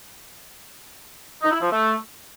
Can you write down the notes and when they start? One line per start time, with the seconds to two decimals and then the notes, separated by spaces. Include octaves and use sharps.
1.42 D#4
1.51 E4
1.61 F3
1.71 A3